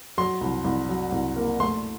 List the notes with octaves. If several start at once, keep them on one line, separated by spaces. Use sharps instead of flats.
F#3 C6
C2
C2
F#3
C2
A#3
A3 C6